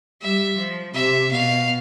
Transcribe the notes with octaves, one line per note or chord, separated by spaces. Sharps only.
G3 E5
F3
C3 E5
B2 F5